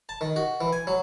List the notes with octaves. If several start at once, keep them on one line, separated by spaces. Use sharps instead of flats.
A5
D#3
F#4
E3
G#5
F#3